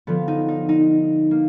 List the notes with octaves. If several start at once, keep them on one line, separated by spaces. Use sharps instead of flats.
D3 F3 B3
D#4
D#4
D#4
A#3